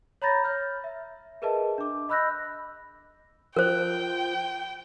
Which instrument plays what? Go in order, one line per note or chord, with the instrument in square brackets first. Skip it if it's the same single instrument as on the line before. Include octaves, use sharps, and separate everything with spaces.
[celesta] C#5 A#5 B5 G6 A6 A#6
C#5 F6 G6
E5
G#4 A#4 B4 D#5 E5 A5
D4 D6
D#5 B5 E6 F#6 G6 A#6
[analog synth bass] F3 [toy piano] A#4 C5 [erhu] G5